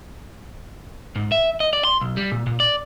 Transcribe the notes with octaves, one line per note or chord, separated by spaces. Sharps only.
G#2
E5
D#5
D5
C6
B1
G3
A#2
A#2
D5